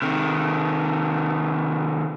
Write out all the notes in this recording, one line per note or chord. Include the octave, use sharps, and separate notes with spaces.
C3 D#3